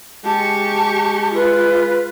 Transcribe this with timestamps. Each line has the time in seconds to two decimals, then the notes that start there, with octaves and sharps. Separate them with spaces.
0.25 G#3 G4 A5 C#6
1.34 F4 B4